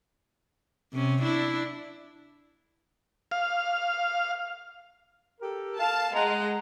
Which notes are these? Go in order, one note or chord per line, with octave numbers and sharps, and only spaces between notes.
C3 C#4
D4 E4
F5
G4 A4 A#4
F5 A5
G#3 F#5 A#5